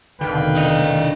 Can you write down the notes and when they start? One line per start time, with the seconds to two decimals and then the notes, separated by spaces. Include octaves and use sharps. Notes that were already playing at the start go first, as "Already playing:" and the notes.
0.21 F1 B2 D3 D#3 B4 F5 G5
0.57 D4 D#5